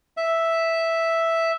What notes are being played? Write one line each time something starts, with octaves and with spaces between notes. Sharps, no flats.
E5